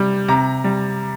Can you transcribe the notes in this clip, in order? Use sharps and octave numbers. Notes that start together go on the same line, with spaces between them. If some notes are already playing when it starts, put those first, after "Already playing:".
Already playing: C3 G3
C3 A#5
G3